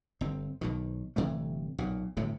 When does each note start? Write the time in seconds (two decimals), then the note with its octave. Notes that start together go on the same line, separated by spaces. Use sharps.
0.21 G1 C4
0.61 B1 B2 D#3
1.16 G1 C3 E3 A3
1.78 B1 A#2
2.17 G1 F#2 A2 C3